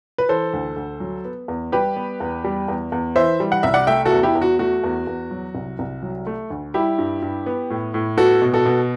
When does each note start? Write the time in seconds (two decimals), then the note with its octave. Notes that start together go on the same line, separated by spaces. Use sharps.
0.18 B4
0.29 E3 A4 C5
0.53 D2
0.76 D2
1.00 F#3
1.25 B3
1.48 E2
1.72 G3 G4 B4
1.96 B3
2.20 E2
2.44 G3
2.68 E2
2.92 E2
3.16 E3 C5 E5
3.40 G3
3.52 F#5
3.63 C2 E5
3.74 D5 F#5
3.87 A3 E5 G5
4.05 F#4 A4
4.12 E2
4.23 E4 G4
4.35 E2
4.42 F#4
4.59 A3 F#4
4.84 E2
5.07 E2
5.31 F#3
5.55 C2
5.79 C2
6.03 F#3
6.27 A3
6.50 D2
6.74 G3 E4 G4
6.98 G2
7.22 G2
7.46 B3
7.70 A2
7.94 A2
8.18 B3 F#4 A4
8.42 B2
8.54 F#4 A4
8.66 B2